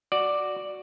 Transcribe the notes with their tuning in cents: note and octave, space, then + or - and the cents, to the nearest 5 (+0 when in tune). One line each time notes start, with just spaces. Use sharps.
F#4 +0 D5 +5